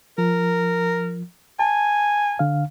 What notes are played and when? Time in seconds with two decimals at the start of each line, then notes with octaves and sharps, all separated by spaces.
0.18 F3 A#4
1.59 G#5 A5
2.39 D3 F5